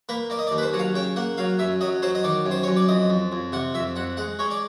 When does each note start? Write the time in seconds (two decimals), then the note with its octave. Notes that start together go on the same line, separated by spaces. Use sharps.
0.09 A#3 B4
0.30 A#3 D5
0.39 D#5
0.47 D5
0.52 D#2
0.58 B4
0.62 C5
0.73 F#3 F#5
0.79 F5
0.95 C#3 G5
1.16 A#3 F#5
1.38 F#3 F5
1.59 F#2 E5
1.81 F#3 D#5
2.02 F#3 C5
2.15 D#5
2.24 D#3 D5
2.46 F#2
2.51 C5
2.63 F#2 C#5
2.76 D5
2.88 F2 D#5
3.10 F2
3.32 F2
3.53 C3 F#5
3.74 F2 E5
3.96 F2 F#5
4.17 G#3 F#5
4.39 G#3 C#5
4.51 D5